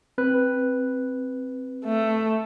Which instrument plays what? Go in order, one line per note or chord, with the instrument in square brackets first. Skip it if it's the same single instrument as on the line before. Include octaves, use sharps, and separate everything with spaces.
[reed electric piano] C4 B4 F#6
[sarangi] A3